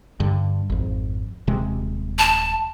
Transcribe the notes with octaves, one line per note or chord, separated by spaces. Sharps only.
G2 D3
G#1 F2
D#1 C3 G#3
A5